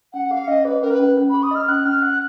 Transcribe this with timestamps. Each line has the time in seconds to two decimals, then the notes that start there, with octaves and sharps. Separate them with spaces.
0.13 C#4 F#5
0.31 G#4 F5
0.48 C#4 D#5
0.65 G#4 B4
0.82 C#4 A#4
0.91 B4
0.99 C#4
1.17 C#4
1.29 G#4 B5
1.43 D#6
1.51 D#5 F6
1.68 C#4 F#6
1.85 C#4 F6
2.02 F#5 F#6